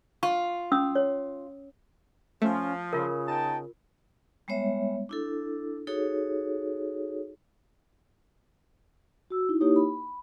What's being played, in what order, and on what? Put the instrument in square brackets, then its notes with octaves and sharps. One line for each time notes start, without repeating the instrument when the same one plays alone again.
[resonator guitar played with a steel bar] F4 [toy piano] C#6
[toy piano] C#4 D#6 E6
C#5
[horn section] F3 [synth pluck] A3 [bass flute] C#4
[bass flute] C#3 [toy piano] F4 A#4
[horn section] D#4 G5 A5
[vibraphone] G3 G#3 B3 C#5 E5
D4 E4 A4
D#4 F#4 G#4 A4 C#5
F#4 E6
D#4 E4
A#3 D#4 E4 G4 C#5 D#6
B5